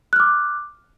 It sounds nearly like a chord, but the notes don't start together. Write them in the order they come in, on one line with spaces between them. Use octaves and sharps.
F#6 F6 D6